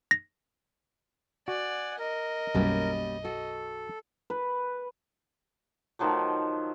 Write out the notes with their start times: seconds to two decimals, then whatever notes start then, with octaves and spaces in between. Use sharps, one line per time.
0.11 A#6
1.48 F#4 D5 F#5 G#5
1.99 A#4 D#5
2.55 B1 F#2 G3 A#3 C#4
3.24 F#4 A4
4.30 B4
5.99 D#3 F3 F#3 A3